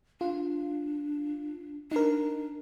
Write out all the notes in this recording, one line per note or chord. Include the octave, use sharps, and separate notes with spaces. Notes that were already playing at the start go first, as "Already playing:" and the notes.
D4 F4
D4 D#4 A#4